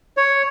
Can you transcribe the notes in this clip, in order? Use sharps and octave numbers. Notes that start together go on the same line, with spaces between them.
C#5